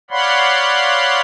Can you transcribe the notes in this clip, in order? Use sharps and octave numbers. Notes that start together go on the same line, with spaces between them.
C#5 D5 F5 F#5 B5 C6